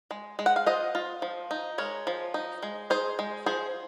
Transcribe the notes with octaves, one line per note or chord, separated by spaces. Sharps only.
G#3
G#3
F#5
F5
F4 C5 D#5
F4
F3
D#4
G#3 A#4 C#5
F3
D#4
G#3
D#4 G#4 C5
G#3
F3 G#4 C5